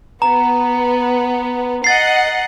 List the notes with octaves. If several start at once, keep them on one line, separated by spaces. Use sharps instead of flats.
B3 A#5
D#5 F#5 A6 C7